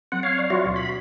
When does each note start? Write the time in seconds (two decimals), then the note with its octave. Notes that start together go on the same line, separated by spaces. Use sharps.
0.12 F#3 C4 F#5
0.23 C#5 F5
0.39 D5
0.50 F#3 F4 F#4 E5
0.64 D2 B2
0.76 B5